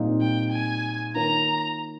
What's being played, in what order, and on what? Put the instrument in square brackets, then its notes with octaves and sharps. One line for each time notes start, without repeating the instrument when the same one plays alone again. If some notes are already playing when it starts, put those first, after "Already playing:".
Already playing: [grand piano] A#2 G3 C4 D#4
[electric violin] G5
G#5
[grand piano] D#3 A#3 F4 A#4 C#5 [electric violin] A#5